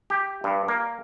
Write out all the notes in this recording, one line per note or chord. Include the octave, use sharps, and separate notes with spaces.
G4
G2
A#3